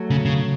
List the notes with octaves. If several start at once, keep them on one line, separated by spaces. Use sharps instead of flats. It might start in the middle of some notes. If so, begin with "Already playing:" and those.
Already playing: F#3 A3
C#3
C#3